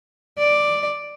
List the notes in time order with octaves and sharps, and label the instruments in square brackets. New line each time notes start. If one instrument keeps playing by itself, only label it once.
[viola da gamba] D5